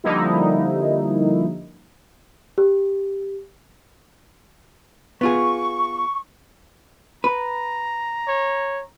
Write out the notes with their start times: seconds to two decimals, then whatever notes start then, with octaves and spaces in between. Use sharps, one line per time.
0.04 D3 F3 G3 A#3 D#4 E4
2.58 G4
5.21 B3 F4 G#4 C#6
7.24 B4 A#5
8.27 C#5